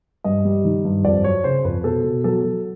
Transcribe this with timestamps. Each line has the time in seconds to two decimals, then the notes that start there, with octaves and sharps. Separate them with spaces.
0.24 G2 D#5
0.45 G3
0.64 D#3
0.85 G2
1.04 F2 D5
1.24 F#3 C#5
1.44 C#3 C5
1.64 F2 B4
1.84 B2 A4
2.04 B2
2.24 F#3 A4
2.44 F#3